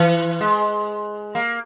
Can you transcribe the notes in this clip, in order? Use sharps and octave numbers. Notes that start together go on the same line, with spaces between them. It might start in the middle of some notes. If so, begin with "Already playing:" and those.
Already playing: E3
G#3
A#3